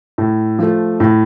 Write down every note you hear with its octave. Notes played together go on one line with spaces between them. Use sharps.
A2
F3 A3
A2